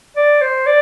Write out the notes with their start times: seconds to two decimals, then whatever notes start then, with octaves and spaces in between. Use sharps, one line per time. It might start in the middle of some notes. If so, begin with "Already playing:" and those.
0.17 D5
0.41 C5
0.67 D5